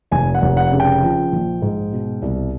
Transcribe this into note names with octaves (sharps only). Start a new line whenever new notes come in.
F1 G#5
F#5
F1
F#5
C#3
G5
F3
A#1
G#2
B2
C2